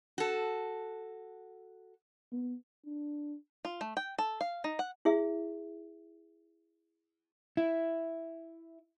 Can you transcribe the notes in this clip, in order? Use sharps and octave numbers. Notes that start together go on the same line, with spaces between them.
F#4 A4
B3
D4
F4
A3
G5
A4
F5
D#4
F#5
E4 G#4 E5
E4